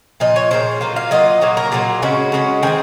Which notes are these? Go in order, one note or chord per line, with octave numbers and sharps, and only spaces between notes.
A#2 F3 D#5
C#5
A#2 F3 G#3 C#4 C5
F#3 A#3 F4
F5
F#3 A#3 F4 D#5
A#2 F#3 A#3 C#5
A#4
A#2 F#3 A#3 G#4
C#3 G#3 C#4 F#4
C#3 G#3 C#4
D#3 G#3 C4 G#4